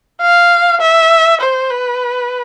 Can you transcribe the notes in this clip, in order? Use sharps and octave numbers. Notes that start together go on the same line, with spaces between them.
F5
E5
C5
B4